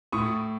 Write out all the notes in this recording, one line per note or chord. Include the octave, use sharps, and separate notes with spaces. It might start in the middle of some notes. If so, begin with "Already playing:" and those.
A2 C#6 D#6